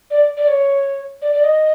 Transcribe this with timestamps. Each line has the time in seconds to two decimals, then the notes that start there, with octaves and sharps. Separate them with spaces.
0.10 D5
0.36 D5
0.47 C#5
1.21 D5
1.32 D5
1.43 D#5